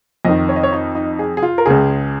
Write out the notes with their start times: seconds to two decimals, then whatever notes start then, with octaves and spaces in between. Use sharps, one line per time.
0.25 F2 D#3 D#5
0.49 C#5
0.56 D#5
0.63 C#5
0.72 D#4
0.95 D#4
1.19 G#4
1.37 G#4
1.42 F4
1.58 A#4
1.66 C#2 C#3 G#4